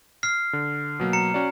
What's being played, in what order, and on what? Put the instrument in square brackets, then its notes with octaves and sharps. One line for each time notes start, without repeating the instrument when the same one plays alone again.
[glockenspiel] F6 C7
[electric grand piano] D3
B2 F#3 A#3
[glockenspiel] A#5 C#7
[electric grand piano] C#4 F#4 D5